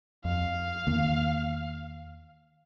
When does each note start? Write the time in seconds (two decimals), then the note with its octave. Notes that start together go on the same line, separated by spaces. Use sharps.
0.25 F2 F5
0.87 E2 D#3 A#3